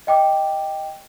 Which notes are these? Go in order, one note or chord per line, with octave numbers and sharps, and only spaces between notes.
D#5 G5 D6